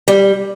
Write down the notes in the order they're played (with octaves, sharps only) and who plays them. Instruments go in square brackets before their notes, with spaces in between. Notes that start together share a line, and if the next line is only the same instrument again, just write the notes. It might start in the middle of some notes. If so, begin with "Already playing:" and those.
[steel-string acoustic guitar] G3